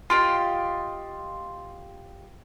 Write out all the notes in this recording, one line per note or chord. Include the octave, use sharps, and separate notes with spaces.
F4 G4 D#5 C6